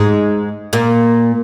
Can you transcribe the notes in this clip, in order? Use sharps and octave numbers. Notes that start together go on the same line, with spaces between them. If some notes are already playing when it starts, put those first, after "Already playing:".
Already playing: G#2 G#3
A#2 A#3